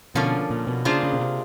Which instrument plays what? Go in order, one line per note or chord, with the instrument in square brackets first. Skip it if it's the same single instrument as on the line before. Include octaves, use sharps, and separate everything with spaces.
[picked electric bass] B2 [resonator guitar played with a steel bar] D3 F3 A#3 C#4
[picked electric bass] A#2
B2
[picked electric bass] C#3 [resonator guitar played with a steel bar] A#3 D4 F4 G#4 C5
[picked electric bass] C#3
B2
C3